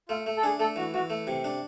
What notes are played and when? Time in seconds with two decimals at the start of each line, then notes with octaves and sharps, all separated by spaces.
0.08 A3 F4
0.26 A3
0.37 A4
0.43 D4 G#4
0.59 A3 A4
0.76 E3 F#4
0.94 E3 F#4
1.10 A3
1.27 C3
1.44 D4